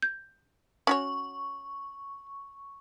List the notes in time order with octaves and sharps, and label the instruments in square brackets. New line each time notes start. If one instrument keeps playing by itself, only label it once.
[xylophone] G6
[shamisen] C#4 F#4 C#5 [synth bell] C#6